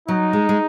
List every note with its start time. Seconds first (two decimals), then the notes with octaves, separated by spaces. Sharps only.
0.08 F#3 D#4
0.33 G#3
0.49 G#3